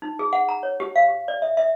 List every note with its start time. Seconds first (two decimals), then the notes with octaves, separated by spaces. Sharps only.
0.02 D#4
0.19 G#4
0.33 F#5
0.49 A#5
0.63 C#5
0.80 G4
0.96 F5
1.08 G4
1.28 D5
1.42 E5
1.57 E5